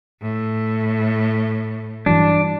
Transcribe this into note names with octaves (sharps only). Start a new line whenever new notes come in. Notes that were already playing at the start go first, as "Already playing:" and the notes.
A2
G2 E3 F#3 D4